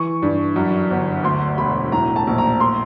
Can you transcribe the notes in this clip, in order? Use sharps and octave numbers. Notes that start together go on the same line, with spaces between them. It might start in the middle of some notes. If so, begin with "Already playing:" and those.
Already playing: E3 C#6
G2
F#2
G1
D2 C6
E1 B5
A2 A#5
A5
A#1
A#5
C6